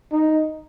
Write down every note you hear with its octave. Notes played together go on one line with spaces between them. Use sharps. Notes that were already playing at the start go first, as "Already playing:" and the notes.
D#4